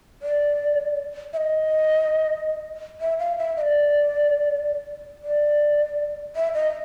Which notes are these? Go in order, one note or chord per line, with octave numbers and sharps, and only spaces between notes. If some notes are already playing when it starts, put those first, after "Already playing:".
D5
E5
D#5
E5
F5
E5
D#5
D5
D5
E5
D#5